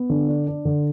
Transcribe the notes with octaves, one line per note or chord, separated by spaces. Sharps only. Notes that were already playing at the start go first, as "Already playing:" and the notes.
Already playing: B3
D3
D4
D4
D3